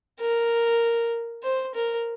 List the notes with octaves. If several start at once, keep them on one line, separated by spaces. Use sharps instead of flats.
A#4
C5
A#4